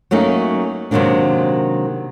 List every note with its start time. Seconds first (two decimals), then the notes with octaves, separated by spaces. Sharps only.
0.11 F#3 A3 A#3 C#4 D#4
0.91 C3 D#3 F#3 G#3 A#3 D4